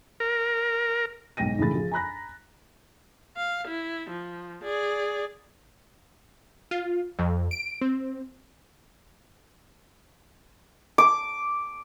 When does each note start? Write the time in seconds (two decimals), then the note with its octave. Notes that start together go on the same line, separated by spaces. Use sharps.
0.20 A#4
1.37 B1 G#2 G5 A#6 D#7
1.58 A#1 A2 C#3 E3 B5 A6
1.75 F3 G#4
1.91 G#5 A#5 B5 F#6 A#6
3.37 F5
3.67 E4
4.10 F3
4.63 G#4 D5
6.71 F4
7.19 F2
7.51 D7
7.81 C4
10.98 D6